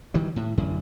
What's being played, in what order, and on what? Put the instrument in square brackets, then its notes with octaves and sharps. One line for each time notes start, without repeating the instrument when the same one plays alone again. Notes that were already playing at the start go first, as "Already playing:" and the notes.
[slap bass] D#3 E3 F#3 G3
A2
A1 F#2 D3